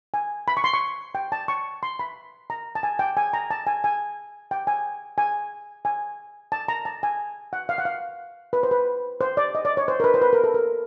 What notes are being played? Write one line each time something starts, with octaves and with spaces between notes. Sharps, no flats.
G#5
B5
C#6
C6
C#6
G5
A5
C#6
C6
B5
A#5
A5
G#5
G5
G#5
A#5
A5
G#5
G#5
G5
G#5
G#5
G#5
A5
A#5
A5
G#5
F#5
F5
F#5
F5
B4
C5
B4
C5
D5
D#5
D5
C#5
C5
A#4
B4
C5
B4
A#4
A4
A#4